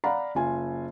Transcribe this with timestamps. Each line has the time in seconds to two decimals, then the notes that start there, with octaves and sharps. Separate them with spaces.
0.04 D5 F5 F#5 A#5 B5
0.35 F#1 F4 G#5